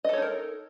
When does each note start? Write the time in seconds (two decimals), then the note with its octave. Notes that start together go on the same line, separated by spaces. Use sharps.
0.04 D#5
0.09 A4
0.13 C#5
0.18 D#4
0.22 A#4